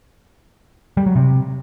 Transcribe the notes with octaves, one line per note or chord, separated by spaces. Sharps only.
G3
F#3
C3